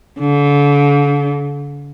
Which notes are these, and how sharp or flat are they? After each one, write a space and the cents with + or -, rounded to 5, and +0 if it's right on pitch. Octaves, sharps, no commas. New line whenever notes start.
D3 -40